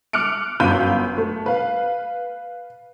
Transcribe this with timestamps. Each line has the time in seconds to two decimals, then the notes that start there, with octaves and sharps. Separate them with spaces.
0.13 D6 F6 F#6 C#7 D7
0.60 G1 F#2 F4 B5 G6 D#7
1.18 A3
1.46 B4 F5